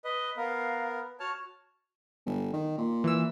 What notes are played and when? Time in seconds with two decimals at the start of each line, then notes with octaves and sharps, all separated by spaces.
0.04 B4 D#5
0.37 B3 A#4 F5
1.20 F#4 C#5 A5 F6
2.26 G1
2.53 D#3
2.78 A#2
3.04 E3 E6